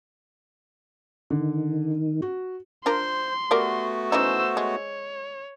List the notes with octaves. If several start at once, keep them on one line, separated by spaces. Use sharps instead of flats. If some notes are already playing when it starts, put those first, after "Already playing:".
D3 D#3
F#4
D4 F4 A#4 C5 C6
A3 B3 F#4 G4 A#4 D5
E3 C#4 D#4 C5 E6
G#3 C#5